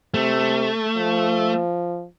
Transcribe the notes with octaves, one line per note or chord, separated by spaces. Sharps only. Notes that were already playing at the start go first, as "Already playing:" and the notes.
C3 A3
F3